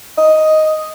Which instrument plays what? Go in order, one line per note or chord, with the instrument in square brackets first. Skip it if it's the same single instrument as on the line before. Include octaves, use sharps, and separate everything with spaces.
[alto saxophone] D#5